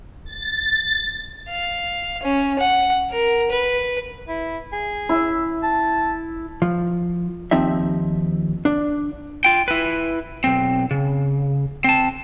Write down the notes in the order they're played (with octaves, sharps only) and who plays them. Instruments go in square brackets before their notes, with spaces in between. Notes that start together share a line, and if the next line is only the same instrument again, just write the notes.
[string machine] A6
[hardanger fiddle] F5
C#4
F#5
A#4
B4
[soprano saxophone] E4
G#4
[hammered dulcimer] E4
[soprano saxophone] A5
[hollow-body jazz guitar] F3
D#2 F3 C4 D#4 E5
D4
[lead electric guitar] F4 G5
E4 B4
B1 C4
C#3
C4 A5